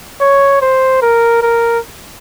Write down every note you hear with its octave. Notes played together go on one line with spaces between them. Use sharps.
C#5
C5
A#4
A#4